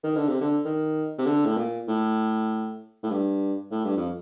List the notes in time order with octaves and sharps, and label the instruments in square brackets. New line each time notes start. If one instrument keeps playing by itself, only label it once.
[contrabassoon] D#3
D3
C3
D3
D#3
C3
D3
A2
A#2
A2
A2
G2
A2
G2
F2